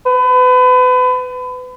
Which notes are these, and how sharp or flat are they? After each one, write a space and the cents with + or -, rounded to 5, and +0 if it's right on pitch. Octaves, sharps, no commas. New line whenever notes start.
B4 +30